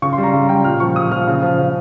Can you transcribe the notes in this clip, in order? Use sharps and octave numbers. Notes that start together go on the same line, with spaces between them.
C#3 C#6
C6
G3
A#5
C#3 A#5
G3 G5
A#2 F6
F3 C#6
A#2 D#6
F3 F6
C#3
F3
C#3